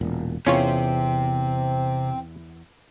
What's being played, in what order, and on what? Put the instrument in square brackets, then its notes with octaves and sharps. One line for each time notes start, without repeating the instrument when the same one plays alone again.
[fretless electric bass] E1 A#2
[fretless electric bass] E2 [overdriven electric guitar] C3 [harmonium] C4 [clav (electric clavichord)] C#4 F4 C#5